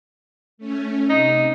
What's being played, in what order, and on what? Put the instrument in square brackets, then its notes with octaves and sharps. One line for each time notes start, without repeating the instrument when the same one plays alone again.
[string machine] A3 C#4
[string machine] C3 [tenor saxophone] D#4